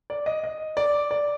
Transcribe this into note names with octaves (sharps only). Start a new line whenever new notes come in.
D5
D#5
D#5
D5
D5